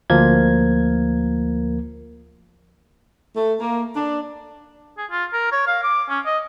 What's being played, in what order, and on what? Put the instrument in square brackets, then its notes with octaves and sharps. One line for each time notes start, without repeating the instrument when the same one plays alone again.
[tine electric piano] D2 F3 A#3 A#4 G#6
[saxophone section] A3
A#3
D4
[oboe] G#4
F4
A#4
C#5
F5
D6
C#4
D#5